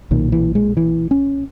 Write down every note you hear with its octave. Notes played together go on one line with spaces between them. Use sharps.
B1 A#2 D#3
E3
G#3
E3
C#4